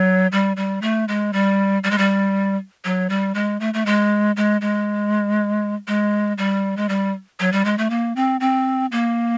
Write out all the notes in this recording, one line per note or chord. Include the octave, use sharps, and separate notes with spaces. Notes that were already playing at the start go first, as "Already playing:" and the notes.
Already playing: F#3
G3
G3
A3
G#3
G3
G3
G#3
G3
F#3
G3
G#3
A3
A3
G#3
G#3
G#3
G#3
G3
G#3
G3
F#3
G3
G#3
A3
A#3
C4
C4
A#3